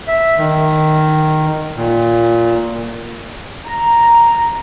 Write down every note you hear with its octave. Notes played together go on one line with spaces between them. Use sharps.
E5
D#3
A#2
A#5